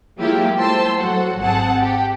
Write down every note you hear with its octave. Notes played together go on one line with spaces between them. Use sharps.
F#3 G#3 A#3 E4 F4 G4
A3 C5 A5 C6 E6
F#3 F#4 A4 C5 F#5
G#1 C4 G#4 F#5 A5
G4